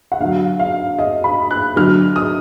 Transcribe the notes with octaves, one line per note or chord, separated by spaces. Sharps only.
F#5
D3 F#3 F5
F5
D#5
B5
F#6
D3 F#3 F6
D#6